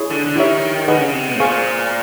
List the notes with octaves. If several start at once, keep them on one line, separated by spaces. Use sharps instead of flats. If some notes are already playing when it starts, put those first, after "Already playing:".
Already playing: E4 G#4 C#5
D3
D3
D#3 E4 G4 A#4 C#5 E5
D#3 G#4 B4 D#5 F#5
D3
C#3
C3
B2
A2
A#2 G#4 C5 F5 G#5 C#6